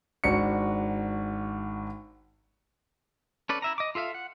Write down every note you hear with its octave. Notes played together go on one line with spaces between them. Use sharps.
G#1 D4 F#4 C#7
C#4 A4 B4 D5
E4 E5 A#5
D#5 D6
F4 A4 E5 F5
F#5